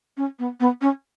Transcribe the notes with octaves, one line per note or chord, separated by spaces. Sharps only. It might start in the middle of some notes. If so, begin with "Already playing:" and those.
C#4
B3
B3
C#4